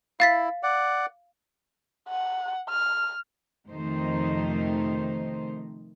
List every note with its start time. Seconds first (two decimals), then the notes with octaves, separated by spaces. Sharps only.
0.20 E4 F5 A6 B6
0.63 D5 F#5
2.09 F#5
2.69 F6
3.68 F2 C3 D#3 A3 D#4 C5